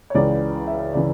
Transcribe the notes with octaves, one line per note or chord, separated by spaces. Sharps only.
C#5
C#2 C#3 E3 D5
E5
C#3 E3 D5